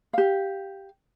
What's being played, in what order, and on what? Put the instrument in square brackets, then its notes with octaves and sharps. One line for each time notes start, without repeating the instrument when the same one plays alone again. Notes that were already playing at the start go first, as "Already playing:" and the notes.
[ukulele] G4 F5